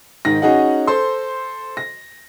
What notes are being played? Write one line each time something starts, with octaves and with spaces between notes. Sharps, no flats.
G#2 D#3 A#6
C#4 D#4 F#4 G#4 D#5 F#5
A4 C5 C6
A#6